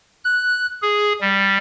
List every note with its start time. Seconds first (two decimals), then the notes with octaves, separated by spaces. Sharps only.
0.25 F#6
0.82 G#4
1.21 G3